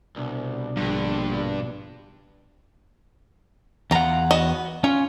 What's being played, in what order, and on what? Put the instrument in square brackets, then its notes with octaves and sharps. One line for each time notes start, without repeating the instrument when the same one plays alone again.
[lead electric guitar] C2 [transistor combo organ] B2 D4
[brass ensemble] A#1 [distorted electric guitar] G2 [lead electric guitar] D3
[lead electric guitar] E2 F#5 [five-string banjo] F4 A#5
[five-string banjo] B3 F#4 D#5
[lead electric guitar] C#4 [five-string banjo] F4